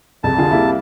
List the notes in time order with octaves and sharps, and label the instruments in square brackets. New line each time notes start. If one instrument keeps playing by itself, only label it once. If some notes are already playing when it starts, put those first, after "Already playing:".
[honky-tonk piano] C2 F2 C#3 [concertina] A5
[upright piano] D3 F4 G#4
G3 A#3 E4